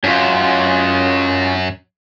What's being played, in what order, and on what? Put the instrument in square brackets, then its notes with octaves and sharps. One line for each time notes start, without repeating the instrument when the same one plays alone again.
[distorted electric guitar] F#2 [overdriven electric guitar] C#4 F4